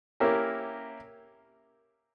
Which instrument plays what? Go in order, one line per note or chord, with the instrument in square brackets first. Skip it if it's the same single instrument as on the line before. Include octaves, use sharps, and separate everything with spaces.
[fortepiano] A#3 C#4 E4 G4 A#4